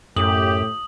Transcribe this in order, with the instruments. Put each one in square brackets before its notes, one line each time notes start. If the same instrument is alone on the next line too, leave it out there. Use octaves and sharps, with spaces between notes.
[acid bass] F#2 [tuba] A2 [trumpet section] G4 [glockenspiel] D#6 F#7